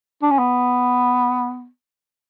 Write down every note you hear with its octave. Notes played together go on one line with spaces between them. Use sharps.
D4
C#4
B3